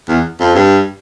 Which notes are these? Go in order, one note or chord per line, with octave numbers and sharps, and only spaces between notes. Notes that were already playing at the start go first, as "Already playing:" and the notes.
E2
F2
G2